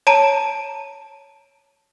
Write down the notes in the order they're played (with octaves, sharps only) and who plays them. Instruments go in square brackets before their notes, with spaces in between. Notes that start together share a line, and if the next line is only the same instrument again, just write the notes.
[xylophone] C#5 A5 A#5 D7